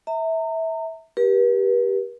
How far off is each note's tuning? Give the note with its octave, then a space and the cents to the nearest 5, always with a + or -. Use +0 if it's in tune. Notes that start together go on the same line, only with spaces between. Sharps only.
E5 -20 A#5 -35
G4 +0 B4 -45